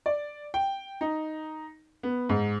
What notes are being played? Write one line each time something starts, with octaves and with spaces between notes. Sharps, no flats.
D5
G5
D#4
B3
G#2